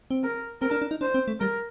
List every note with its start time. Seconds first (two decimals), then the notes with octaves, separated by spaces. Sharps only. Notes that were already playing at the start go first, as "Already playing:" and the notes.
0.11 C4
0.23 A#4
0.61 C4 A#4
0.71 D4
0.82 D4
0.91 D#4
1.01 D4 C5
1.14 C4
1.28 A3
1.40 G3 A#4